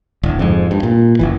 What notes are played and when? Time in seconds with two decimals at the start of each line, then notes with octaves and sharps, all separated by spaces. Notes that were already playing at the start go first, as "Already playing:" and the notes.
0.23 D1
0.39 F2 G#2
0.71 G2
0.83 A#2
1.19 F#1 C2 E3